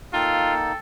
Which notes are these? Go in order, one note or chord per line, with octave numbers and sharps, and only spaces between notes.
A#3 D#4 F4 A4 G5